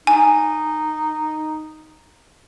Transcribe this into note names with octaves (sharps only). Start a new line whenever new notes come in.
D#4 G#5